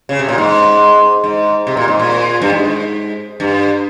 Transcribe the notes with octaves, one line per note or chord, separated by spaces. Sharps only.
C#3
C3
A#2
G#2
G#2
C3
A#2
G#2
A#2
G2
G#2
G2